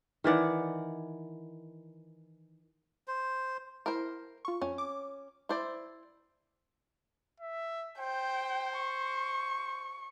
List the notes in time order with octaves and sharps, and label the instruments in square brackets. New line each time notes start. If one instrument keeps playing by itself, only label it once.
[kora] D#3 E3 D5 F#5
[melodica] C5
[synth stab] E4 [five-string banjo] A#4 C5
[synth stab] F4 C#6
[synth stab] F2 [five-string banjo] C#4
[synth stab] D6
[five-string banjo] E4 C5 D5
[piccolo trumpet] E5
[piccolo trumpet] C5 [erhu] G5
[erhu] C#6